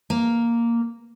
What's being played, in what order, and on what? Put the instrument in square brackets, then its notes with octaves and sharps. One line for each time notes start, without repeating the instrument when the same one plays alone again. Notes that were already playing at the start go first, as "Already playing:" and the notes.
[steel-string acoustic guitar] A#3